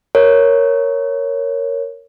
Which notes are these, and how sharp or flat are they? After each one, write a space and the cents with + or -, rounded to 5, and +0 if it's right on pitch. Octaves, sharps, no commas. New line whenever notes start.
A#4 +0 C#5 +0